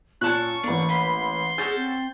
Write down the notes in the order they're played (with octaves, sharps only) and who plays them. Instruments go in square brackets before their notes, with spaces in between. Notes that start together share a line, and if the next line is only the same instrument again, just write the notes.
[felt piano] A#2 F4 [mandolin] C#4 A5 F#6 [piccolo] C#6
[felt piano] A1 A#3 [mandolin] D4
[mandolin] B4 B5 [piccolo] C6
[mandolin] C#4 F#4 A4 [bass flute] G#4 [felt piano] G6 A6
[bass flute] C4